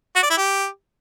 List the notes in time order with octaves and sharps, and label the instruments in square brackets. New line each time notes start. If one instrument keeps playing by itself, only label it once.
[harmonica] F#4
D5
E4
G4